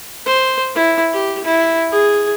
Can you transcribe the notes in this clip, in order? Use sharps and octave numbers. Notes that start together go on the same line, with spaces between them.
C5
E4
G4
E4
G#4